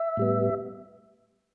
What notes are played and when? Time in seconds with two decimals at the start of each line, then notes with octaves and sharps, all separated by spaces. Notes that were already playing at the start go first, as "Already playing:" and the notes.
Already playing: E5
0.17 A2 G3 B3